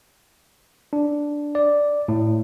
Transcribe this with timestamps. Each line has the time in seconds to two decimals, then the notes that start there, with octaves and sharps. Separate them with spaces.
0.93 D4
1.55 D5
2.08 A2